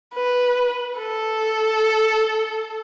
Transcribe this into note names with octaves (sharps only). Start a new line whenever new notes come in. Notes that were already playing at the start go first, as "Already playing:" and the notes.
B4
A4